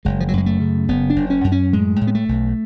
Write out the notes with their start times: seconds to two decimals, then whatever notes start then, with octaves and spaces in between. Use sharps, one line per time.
0.05 F#1 G#3
0.20 F3
0.28 F#3
0.33 F#2 G#3
0.46 A3
0.60 C#3
0.88 F#1 B3
1.10 D4
1.16 F#1
1.30 C#4
1.44 F#2
1.52 C#4
1.73 A2 G#3
2.01 A2
2.07 B3
2.15 A3
2.29 B1